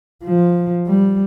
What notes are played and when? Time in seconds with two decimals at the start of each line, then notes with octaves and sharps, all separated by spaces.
0.24 F3
0.87 G3